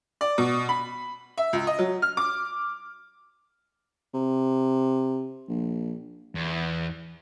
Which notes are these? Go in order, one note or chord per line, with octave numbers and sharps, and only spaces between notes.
D5
B2
B5
E5
C#2
D#5
F#3
F6
D6
C3
A#1
E2